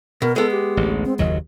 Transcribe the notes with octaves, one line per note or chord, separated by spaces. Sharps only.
B2 A#4
G#3 B3 A4
G4
A1 D2
C4
F#1 D#2 F#3 D#5